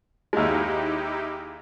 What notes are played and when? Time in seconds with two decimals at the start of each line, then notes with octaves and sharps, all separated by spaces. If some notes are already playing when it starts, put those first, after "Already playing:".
0.33 D#2 G#3 D#4 E4 G4